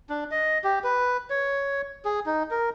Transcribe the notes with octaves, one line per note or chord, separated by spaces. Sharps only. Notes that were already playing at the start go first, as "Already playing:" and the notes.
D4
D#5
G4
B4
C#5
G#4
D#4
A#4